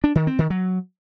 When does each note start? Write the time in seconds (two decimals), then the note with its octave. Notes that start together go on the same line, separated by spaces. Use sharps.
0.04 D4
0.15 D#3
0.27 C4
0.39 D#3
0.50 F#3